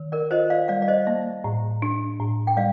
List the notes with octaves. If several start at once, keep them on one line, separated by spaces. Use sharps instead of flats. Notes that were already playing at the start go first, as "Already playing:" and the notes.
Already playing: D#3
A#4 D5
F4 C5 D#5
D5 F5
G3 D5 F5
D5
C5 D#5
A#3
A2
D4
A2
G5
G3 D5 F5